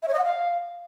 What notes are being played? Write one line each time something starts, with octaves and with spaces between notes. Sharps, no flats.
E5
C#5
D#5
F#5
F5